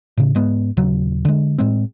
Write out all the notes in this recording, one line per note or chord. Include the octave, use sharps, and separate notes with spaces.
A2 C#3
G#2 G#3 B3
D#1 C#3 F#3
D3 G#3
A2 G#3 C4